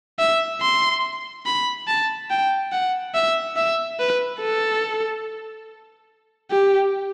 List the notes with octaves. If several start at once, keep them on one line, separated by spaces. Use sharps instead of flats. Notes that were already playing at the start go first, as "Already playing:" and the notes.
E5
C6
B5
A5
G5
F#5
E5
E5
B4
A4
G4